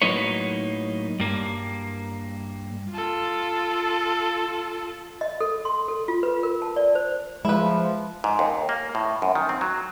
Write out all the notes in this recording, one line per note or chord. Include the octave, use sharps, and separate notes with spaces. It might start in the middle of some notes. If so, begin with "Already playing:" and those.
A2 F#3 A#3 D#4 B4 C#5
G2 A#3
F4 A4
D#5
A4
C6
A4
F4
B4
A#4
A5
D5
C5
F3 G#3 E4 B4
G#2
D#2
A#3
A2
F#2
D#3
C4
F#3